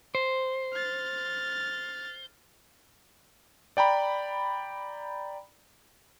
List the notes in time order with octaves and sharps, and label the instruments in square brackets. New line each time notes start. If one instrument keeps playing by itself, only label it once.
[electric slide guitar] C5
[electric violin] F6 A6
[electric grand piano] D5 G5 A#5 B5